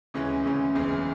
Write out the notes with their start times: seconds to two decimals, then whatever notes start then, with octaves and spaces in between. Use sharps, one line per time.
0.14 D2 C#3 E3 G#3 C#4
0.45 D2 C#3 E3 G#3 C#4
0.75 F#1 E2 C#3 E3 G#3